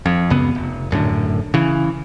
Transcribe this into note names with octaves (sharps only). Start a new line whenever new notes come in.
F2
C#2 F#2 C#3 B3
F1
D#1 F#2 A2 D3
C#3 E3